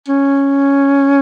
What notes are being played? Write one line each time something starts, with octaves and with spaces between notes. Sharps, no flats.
C#4